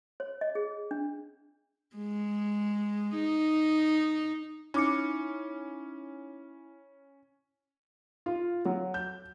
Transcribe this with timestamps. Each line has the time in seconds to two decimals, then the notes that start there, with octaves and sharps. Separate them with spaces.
0.20 C#5
0.41 D#5
0.55 G#4
0.91 D4
1.96 G#3
3.16 D#4
4.74 C#4 D#4 E4 D6 C#7
8.26 F4
8.65 F#3
8.94 G6